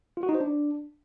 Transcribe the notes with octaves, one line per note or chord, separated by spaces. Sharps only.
F4
F#4
D#4
C5
D4